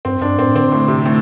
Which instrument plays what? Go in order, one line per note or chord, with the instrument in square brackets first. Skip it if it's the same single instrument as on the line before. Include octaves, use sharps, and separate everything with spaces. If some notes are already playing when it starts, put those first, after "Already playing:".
[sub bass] G2 [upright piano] C4
[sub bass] G2 [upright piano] D4
[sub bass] A2 [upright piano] C4
[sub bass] D3 [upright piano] C4
[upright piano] A2
C3
A2